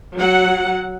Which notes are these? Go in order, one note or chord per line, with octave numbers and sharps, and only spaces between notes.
F#3 F#5